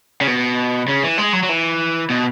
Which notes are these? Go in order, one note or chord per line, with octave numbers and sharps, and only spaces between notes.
C#3
B2
C#3
E3
G#3
F#3
F#3
E3
B2